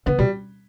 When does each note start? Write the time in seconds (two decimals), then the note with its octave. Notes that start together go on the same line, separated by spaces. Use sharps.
0.06 D3 B3
0.19 B2 G3